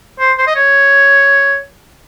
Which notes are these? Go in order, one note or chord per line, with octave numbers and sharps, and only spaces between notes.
C5
C5
D#5
C#5